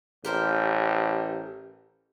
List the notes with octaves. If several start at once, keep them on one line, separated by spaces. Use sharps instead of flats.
A1 G4 A#4 C5